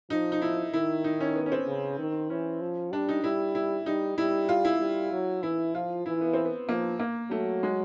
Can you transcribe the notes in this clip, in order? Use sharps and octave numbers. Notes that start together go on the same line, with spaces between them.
F3 D#4
D#4
E4
D#3 E4
D#4
C#4
B3
C#4
C4
C#3
D#3
E3 C#4
F3
G3 D4
D#4
G3 E4
E4
G3 D#4
G3 E4
F4
E4
G3
F#3
E3 E4
F3 F4
E3 E4
B3
C4
B3
F3 A#3
A#3
F#3 A3
G#3